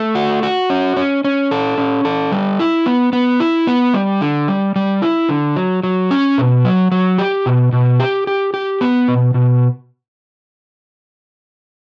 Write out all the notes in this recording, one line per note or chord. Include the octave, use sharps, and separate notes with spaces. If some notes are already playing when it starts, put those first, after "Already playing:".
Already playing: A3
F#4
F#4
C#4
C#4
C#4
A4
C#4
A4
G3
E4
B3
B3
E4
B3
G3
D3
G3
G3
E4
D3
F#3
F#3
C#4
B2
F#3
F#3
G4
B2
B2
G4
G4
G4
B3
B2
B2